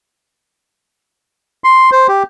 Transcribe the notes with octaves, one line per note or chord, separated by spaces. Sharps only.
C6
C5
G4